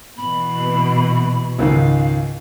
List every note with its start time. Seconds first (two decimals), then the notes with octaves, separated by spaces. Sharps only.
0.18 B2 E3 B5
1.58 C#2 G#2 D#3 F5